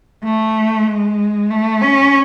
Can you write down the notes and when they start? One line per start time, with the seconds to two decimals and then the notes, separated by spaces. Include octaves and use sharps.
0.24 A3
0.88 G#3
1.50 A3
1.81 C#4